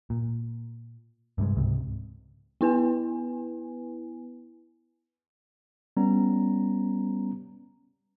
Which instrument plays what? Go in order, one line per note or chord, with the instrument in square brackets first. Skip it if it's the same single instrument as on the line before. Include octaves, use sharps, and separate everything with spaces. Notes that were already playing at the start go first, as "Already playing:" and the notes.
[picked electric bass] A#2
G2 C3 G3 G#3
C#2 G#2 C3
[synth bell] B3 E4 B4 G#5
[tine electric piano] G3 B3 C#4 A#5